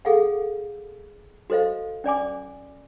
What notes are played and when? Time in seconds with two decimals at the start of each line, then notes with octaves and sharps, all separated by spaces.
0.05 G#4 A4 F5 F#5
1.50 F#4 A4 C5 D#5 F5
2.04 C#4 D5 G#5 D6